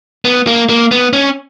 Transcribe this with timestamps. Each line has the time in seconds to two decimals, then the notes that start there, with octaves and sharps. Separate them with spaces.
0.25 B3
0.47 A#3
0.69 A#3
0.91 B3
1.13 C#4